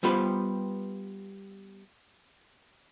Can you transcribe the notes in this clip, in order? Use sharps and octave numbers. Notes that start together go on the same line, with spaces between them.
G3 B3 F4 G4 B4 C5